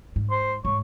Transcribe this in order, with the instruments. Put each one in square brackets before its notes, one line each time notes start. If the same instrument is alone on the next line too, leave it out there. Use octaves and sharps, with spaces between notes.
[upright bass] G#2
[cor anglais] C5
[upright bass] G#2 [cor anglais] C#5